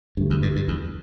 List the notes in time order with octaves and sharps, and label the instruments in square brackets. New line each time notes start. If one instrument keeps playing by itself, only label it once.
[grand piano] D2 D3 A3 G4 [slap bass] G2
[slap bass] E2
G2
G2
E2